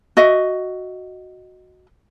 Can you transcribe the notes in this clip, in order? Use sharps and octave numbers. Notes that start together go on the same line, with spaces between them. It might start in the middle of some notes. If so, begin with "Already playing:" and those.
F#4 D#5 E5